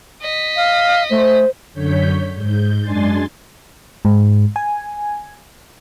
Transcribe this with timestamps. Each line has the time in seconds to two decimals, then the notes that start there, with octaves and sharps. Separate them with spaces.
0.22 D#5 B6
0.56 F5
1.11 A3 C5
1.74 F#2 D3 C#5 G6 B6
2.34 G#2 G6
2.81 F#2 G#3 D4 G#5 C6 A6
4.05 G#2
4.56 G#5